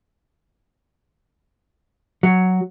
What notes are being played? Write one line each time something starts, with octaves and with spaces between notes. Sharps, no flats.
F#3